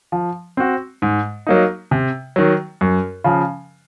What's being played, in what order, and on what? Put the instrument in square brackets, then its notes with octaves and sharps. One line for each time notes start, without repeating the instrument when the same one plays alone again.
[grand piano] F3
C4 F#4
G#2
F#3 A#3 D#4
C3
D#3 F#3
F#2
C#3 F3